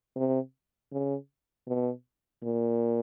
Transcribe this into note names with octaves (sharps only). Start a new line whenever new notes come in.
C3
C#3
B2
A#2